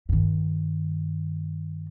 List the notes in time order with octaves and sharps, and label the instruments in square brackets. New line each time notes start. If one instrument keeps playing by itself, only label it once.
[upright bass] G2 D#3